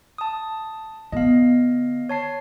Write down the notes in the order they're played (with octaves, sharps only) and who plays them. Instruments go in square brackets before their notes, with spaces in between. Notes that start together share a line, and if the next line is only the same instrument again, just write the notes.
[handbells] A5 D#6
[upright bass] D3 B3 [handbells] D#5 F5
[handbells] C#5 A5 C7